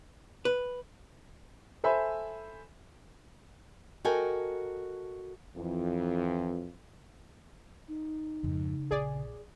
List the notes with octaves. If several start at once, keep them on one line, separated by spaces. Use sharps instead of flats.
B4
A4 C5 E5 G#5 B5
F#4 A4 A#4 D#5 G5 G#5
F2 E3
D#4
F2 G#2 C#3
A#1 A#2 G#4 D5